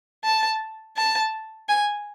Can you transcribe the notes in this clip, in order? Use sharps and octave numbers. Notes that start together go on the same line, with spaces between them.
A5
A5
G#5